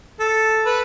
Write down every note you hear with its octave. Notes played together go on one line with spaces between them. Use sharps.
A4
B4